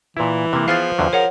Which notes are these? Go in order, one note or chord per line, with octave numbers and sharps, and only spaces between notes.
A#2 E3 E4
C3 A#3 B4
F3 B3 G#4 F5 G5 F6 A6
E2 D3 F#3
G#4 A#4 C#5 F#5